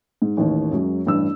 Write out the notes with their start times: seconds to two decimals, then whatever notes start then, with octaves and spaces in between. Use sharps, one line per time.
0.22 G#2
0.37 A1 D#2
0.72 F#2 F#3 G#3
1.06 A1 G2 E6